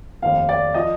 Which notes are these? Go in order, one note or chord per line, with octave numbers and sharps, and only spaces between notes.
F1 D#2 D#3 F5
D5
F3 D#5